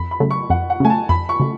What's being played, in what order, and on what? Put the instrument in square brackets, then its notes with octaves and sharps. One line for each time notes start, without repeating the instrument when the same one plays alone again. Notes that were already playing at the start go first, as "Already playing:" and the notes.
Already playing: [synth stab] F2 [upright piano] B5
[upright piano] B5
[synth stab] C#3 F#3 A3
[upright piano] C#6
[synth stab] F2 [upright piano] F#5
[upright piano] F#5
[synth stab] C#3 F#3 A3 [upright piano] G#5
[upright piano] A5
[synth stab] F2 [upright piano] B5
[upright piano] C#6
[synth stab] C#3 F#3 A3